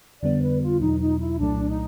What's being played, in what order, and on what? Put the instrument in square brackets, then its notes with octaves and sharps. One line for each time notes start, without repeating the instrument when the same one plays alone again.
[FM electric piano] F2 D3 G3 B3 [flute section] D5
[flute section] B4
F4
[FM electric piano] E2 B2 F#3 [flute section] D#4
[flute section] D#4
E4
[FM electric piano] C2 A#2 F#3 A3 [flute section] D4
[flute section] D#4